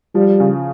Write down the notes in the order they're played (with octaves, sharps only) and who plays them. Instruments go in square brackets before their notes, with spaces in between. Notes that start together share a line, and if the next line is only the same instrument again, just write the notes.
[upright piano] F3 [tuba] G3
[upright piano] C#3